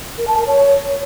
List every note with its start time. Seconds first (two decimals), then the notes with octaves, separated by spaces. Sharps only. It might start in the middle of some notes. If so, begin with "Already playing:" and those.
0.18 A#4
0.27 A5
0.37 A#4
0.47 C#5